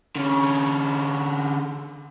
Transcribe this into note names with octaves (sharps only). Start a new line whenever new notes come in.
D3 C#4